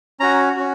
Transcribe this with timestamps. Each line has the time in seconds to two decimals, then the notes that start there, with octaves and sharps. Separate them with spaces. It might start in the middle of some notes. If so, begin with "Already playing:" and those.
0.20 C#4 F#4 A#5
0.56 C#4 F#4